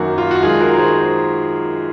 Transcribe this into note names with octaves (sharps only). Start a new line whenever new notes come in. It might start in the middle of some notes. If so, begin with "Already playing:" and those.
Already playing: F#2 D#3 A#3 F#4
F4
F#4
F#2 D#3 G#3 F4 G#4
F#4 A#4
G#4 C5